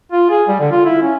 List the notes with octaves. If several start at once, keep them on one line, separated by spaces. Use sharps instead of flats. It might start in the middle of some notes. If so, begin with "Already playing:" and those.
F4
G#4
G3
D3
F4
E4
C#4